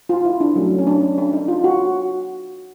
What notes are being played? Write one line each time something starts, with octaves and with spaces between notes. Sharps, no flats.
F4
E4
D4
F#3 A3 C#4
C#4
D4
D4
D#4
F4
F#4